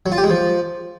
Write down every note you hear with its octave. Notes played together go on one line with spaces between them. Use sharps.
F#3
F4
G4
G#3
F3